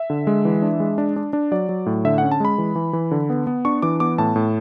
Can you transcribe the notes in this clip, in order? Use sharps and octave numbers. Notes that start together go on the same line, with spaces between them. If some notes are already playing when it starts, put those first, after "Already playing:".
Already playing: E5
D3
G#3
E3
D4
G#3
D4
D4
D4
F#3 D5
F#3
A2
D3 E5
F#5
C#4
A5
G#3 B5
E3
E3
E3
D3
B3
B3
D4 C#6
E3 D6
B3 D6
A2 A5
A2